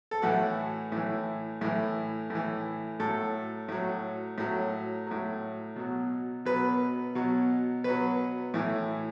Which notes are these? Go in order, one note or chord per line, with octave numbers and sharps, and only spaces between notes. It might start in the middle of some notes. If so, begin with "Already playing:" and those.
A4
A2 E3 F#4
A2 E3
A2 E3
A2 E3
A2 F#3 A4
A2 F#3
A2 F#3
A2 F#3
B2 F#3
B2 F#3 B4
B2 F#3
B2 F#3 B4
A2 E3